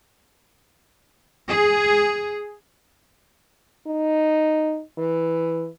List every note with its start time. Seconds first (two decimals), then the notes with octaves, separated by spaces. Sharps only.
1.47 G#4
3.87 D#4
4.98 E3